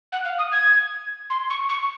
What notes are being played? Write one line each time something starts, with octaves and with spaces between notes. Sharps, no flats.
F#5
F5
D#6
G#6
C6
C#6
C#6